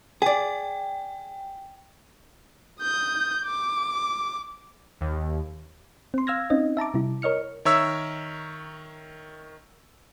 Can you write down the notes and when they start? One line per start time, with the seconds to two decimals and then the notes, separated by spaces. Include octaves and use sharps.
0.22 G#4 D5 G5
2.81 D#6 G6
3.45 D6
5.01 D#2
6.14 C4 C6
6.27 F5 E6 F6 G#6 A#6
6.50 C4 C#4 D#4 D#5
6.77 E5 A5 A#5 D6
6.94 C3 G3 E4
7.22 A#4 C#5 D#5 F6 C#7
7.65 D#3 A#4 C#5 E5 E6